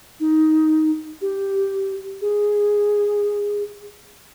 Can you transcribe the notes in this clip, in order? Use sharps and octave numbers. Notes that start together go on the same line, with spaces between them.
D#4
G4
G#4